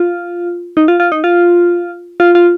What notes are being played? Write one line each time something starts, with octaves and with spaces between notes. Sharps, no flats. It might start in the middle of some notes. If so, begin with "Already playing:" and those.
Already playing: F4
D#4
F4
F4
D#4
F4
F4
F4